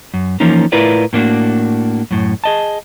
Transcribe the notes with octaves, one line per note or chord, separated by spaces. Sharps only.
F#2
E3 F3 A#3 C#4 D#4
A2 E4 F4 A#4 B4 D5
A2 A#3 D4 F#4
F#2 A2
G#4 D#5 A5